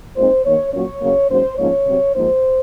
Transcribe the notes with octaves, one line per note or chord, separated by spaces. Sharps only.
A#2 G#3 C4 D#4 C5
D#2 D#3 A#3 D#4 C#5
A#2 F#3 A#3 C#4 C#5
C#3 F#3 A#3
G#2 F#3 A#3 C#4 C5
G#2 F3 A#3 C#4 C#5
C3 F#3 C4
G#2 F3 A#3 D#4 C5